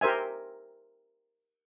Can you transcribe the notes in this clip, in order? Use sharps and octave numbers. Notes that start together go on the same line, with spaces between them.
G4 A#4 C5 E5 G#5